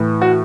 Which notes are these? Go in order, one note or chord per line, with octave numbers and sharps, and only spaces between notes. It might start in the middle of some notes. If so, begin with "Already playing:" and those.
Already playing: A2 E3
F#4